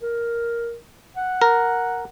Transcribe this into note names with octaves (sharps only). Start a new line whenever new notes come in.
A#4
F#5
A#4